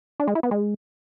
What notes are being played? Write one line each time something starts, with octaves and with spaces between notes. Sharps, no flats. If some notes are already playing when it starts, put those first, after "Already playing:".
D4
G#3
E4
B3
G#3